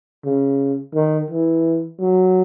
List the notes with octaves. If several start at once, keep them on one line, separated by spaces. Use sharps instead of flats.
C#3
D#3
E3
F#3